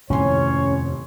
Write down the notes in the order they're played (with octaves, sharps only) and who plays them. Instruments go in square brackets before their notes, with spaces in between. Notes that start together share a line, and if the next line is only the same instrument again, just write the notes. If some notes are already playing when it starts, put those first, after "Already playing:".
[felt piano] D#1 A2 C6 [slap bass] F2 C3 [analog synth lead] C#4 [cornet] C#5